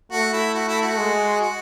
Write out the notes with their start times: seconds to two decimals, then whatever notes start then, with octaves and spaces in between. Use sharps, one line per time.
0.12 A3 F#4
0.33 E4
0.54 F#4
0.68 E4
0.82 F#4
0.97 G#3
1.41 F#4